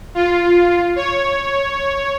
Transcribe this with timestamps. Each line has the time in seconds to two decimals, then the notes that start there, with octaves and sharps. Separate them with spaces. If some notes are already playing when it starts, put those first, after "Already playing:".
0.15 F4
0.96 C#5